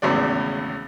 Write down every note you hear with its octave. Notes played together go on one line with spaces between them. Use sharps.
G#1 E2 A2 C#3 B3 D5